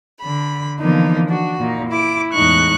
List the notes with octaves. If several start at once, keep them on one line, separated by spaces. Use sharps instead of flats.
D3 B5
D3 E3 F3 A#3 B3 D#4
D4 F#4
A#2 D#4
E4 D6
E2 A2 G#3 D#4 C#6 F#6